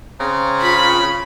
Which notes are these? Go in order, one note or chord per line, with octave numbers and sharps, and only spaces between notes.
C#3 C4 A#5
F4 B5